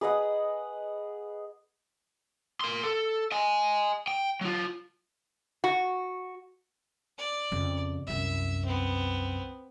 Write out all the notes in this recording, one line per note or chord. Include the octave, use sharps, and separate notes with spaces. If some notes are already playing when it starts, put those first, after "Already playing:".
G#4 B4 D#5 F#5
A#4 C6
A4
D#5 G#5
G5
F#3 F4
F#4
D5
F2 C#3
C2 F#2 E5
B3 C4